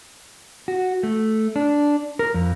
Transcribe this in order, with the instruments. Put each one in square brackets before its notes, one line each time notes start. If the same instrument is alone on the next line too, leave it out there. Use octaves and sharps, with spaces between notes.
[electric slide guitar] F#4
A3
D4
A#4
F2